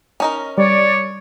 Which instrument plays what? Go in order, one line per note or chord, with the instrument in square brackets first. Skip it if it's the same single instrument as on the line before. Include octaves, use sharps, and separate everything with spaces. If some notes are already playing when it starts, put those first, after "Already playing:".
[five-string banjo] C#4 D#4 A#4
[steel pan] G3 [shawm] C#5 [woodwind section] D5